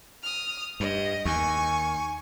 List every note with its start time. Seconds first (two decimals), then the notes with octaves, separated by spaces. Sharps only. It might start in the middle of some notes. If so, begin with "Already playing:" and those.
0.23 D#6 F6
0.80 G2 D#5
1.25 D#2 G#5 C#6